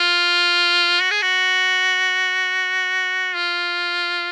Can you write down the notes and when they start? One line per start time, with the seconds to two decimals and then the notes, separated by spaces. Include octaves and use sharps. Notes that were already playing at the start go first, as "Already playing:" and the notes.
Already playing: F4
1.01 F#4
1.11 G#4
1.22 F#4
3.35 F4